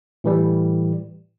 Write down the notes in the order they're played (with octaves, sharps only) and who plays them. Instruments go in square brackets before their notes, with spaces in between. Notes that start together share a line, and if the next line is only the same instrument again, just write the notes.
[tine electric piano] A2 E3 G3